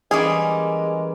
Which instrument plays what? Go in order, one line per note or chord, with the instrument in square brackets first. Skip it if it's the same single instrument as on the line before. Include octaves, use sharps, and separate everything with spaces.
[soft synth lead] E3 [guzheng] G3 A#3 C#4 [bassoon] G#3 [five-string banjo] G#4